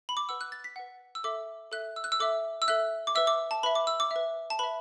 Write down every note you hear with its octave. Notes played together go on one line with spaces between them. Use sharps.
B5
D6
B4 F#5 E6
F#6
A6
B6
B4 F#5
E6
A4 E5 D6
A4 E5 F#6
E6
F#6
E6
A4 E5 D6
E6
A4 E5 F#6
D6
B4 E5 E6
D6
A5
B4 E5 B5
D6
E6
D6
B4 E5
A5
B4 E5 B5